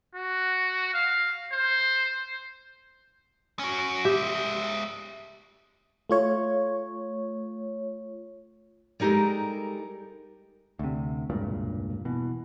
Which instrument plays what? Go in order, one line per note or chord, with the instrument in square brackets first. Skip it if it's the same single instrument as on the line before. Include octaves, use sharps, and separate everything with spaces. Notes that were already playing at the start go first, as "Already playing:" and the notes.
[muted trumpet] F#4
F5
C5
[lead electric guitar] C#4 F#4
[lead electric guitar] G#3 E5 [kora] G4
[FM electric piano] A3 F4 C#5
[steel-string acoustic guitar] G3 G#3 D#4 G4 A4 A#4
[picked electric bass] D2 C3
E1 C#2 G2 A#2
B2 E3